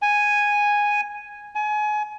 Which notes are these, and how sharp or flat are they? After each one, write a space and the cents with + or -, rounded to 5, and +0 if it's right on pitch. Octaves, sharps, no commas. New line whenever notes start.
G#5 -5
G#5 +30